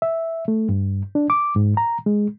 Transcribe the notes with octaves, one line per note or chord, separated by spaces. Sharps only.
E5
A3
G2
D4
D6
G#2
A#5
G#3